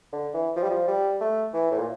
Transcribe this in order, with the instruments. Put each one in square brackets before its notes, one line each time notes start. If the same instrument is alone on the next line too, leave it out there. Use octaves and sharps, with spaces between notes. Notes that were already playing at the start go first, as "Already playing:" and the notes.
[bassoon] D3
E3
F3
G3
F3
G3
A3
E3
A2
A#2